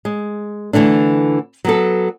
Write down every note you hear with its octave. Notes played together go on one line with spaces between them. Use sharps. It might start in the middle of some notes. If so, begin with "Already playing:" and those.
G#3
D3 E3 A3 D4
F#3 B3 A4